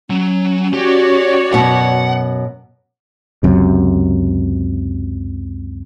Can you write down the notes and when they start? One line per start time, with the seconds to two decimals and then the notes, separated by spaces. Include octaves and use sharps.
0.10 F#3 C#4
0.74 F#4 G4 C#5 D5
1.53 F#2 B2 F#5
3.43 C#2 F#2 C3